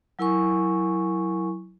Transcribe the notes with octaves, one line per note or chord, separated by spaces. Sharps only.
F#3 E4 A#4 G#5 C#6